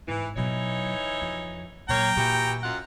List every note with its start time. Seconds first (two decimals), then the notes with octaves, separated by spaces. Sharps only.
0.08 G#2 E3
0.37 B2 E3 F#3 D#4 C#5
1.22 F2
1.89 A#2 F#3 A#3 C#5 G5 A#5
2.17 A#2 E3 F#4 G4
2.63 F#2 F4 F#5